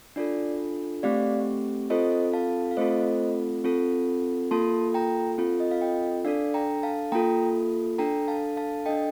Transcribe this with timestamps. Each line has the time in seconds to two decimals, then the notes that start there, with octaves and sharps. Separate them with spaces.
0.16 D4 F4 A4 D5
1.03 A3 C4 G4 D5 F5
1.90 C4 F4 A4 C5 D#5
2.33 F5 A5
2.71 F5
2.77 A3 C4 F4 A4 C5 D#5
3.64 C4 F4 A4
4.51 A#3 F4 A4 A5 C6
4.94 G5 A#5
5.38 C4 F4 A4
5.60 D#5
5.71 F5
5.82 D#5 G5
6.25 D4 A4 D5 F5
6.54 G5 A#5
6.83 F5 A5
7.12 A#3 F4 A4 G5 A#5
7.98 D4 A4 G5 A#5
8.28 F5 A5
8.57 F5 A5
8.86 D4 A4 D#5 G5